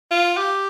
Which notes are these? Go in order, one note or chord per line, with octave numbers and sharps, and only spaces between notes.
F4
G4